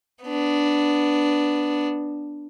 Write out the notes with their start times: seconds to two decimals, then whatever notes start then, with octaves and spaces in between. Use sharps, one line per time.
0.24 B3 D4